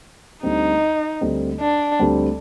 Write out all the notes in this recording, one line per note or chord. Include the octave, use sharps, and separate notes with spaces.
D2 D3 G3 C4 D#4
D2 D3 G3 C4
D4
D2 D3 G3 C4